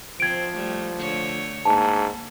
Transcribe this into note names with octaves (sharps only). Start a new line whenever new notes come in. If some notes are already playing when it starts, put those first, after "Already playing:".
F3 C4 G#6 D7
G3 A3
D3 A3 C#5
G#2 A#3 A5